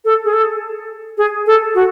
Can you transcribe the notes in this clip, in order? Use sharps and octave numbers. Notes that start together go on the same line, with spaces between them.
A4
G#4
A4
G#4
A4
F#4